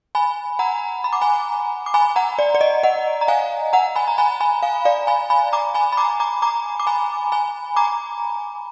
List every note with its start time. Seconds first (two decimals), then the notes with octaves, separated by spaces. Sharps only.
0.15 G#5 B5
0.59 F#5 A#5
1.04 B5
1.13 D6
1.21 G#5 B5
1.86 D6
1.94 G#5 B5
2.16 F#5 A#5
2.39 D5
2.55 D5
2.61 D#5
2.83 D#5 F#5
3.21 A#5
3.28 F5 G#5
3.73 F#5 A#5
3.96 G#5 B5
4.08 A#5
4.18 G#5 B5
4.40 G#5 B5
4.62 F5 G#5
4.85 D5 F5
5.07 G#5 B5
5.30 G#5 B5
5.53 A#5 D6
5.74 G#5 B5
5.92 B5
5.97 A#5 D6
6.20 A#5 D6
6.42 A#5 D6
6.80 D6
6.87 G#5 B5
7.32 G#5 B5
7.76 A#5 D6